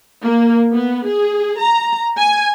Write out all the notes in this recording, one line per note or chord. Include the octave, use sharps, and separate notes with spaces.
A#3
B3
G#4
A#5
G#5